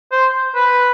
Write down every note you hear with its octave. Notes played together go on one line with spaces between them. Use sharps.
C5
B4